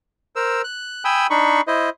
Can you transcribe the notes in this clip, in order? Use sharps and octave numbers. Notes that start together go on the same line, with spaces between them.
A#4 C5 E6
F#6
G5 G#5 B5 D#6 E6
D4 D#4 B5 C#6
E4 C5 D#5